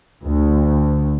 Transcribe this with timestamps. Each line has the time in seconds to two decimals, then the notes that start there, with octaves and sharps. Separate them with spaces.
0.22 D2